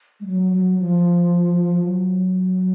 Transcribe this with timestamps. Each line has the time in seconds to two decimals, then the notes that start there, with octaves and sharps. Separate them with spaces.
0.20 G#3
0.26 F#3
0.52 F#3
0.78 F3
1.83 F#3